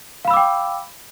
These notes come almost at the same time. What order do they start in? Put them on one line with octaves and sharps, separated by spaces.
F5 B5 E6 D6 G5